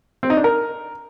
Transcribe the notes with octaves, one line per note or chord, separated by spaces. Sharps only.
C4
D#4
D4
A#4